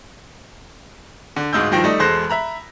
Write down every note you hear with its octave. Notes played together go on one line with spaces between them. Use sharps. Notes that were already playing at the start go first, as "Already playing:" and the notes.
D3
D1 G#2 D#4 E6 G6
G2 D#3 F3 G5 A#6
G3 A3 D#4
E1 G#3 A4 C5 F#6 A#6
E5 A#5 B5